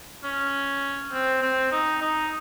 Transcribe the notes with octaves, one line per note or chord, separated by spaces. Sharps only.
C#4
C4
C4
D#4
D#4